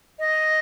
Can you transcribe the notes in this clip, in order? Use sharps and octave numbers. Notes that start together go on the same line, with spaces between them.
D#5